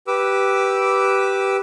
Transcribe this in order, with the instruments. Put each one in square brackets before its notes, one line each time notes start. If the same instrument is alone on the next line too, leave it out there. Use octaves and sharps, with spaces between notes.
[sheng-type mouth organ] G4 B4 D6 E6